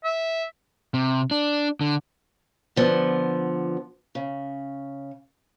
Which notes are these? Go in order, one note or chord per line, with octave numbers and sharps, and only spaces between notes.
E5
C3
D4
D3
D3 F3 B3
C#3